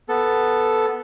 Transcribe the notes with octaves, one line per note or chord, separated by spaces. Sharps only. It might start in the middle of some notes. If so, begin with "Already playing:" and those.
B3 A4